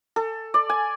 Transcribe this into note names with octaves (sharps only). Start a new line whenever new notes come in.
A4
D5
G#5